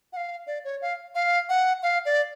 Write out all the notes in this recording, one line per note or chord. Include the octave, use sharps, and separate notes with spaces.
F#5
F5
D5
C#5
F5
F5
F#5
F5
D5